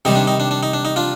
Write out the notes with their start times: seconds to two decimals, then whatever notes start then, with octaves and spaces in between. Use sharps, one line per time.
0.05 C3 D#3 G3 D#4
0.16 D4
0.27 D#4
0.40 D4
0.51 D4
0.63 D#4
0.73 D4
0.85 D#4
0.96 D4 F4